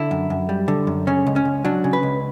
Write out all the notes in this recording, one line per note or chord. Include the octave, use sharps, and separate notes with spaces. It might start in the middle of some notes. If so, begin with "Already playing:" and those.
Already playing: D3 E4
F#2
F#2
G3
D3
F#2
C#3 C#4
C#2
C#4
C#2
F#3 D4
C#3
B4
C#2